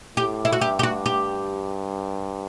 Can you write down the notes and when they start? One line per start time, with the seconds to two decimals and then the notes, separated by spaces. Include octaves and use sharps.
0.17 A2 G4
0.45 E4
0.52 F#4
0.61 G2 G4
0.79 G4
0.83 F#4
1.06 G4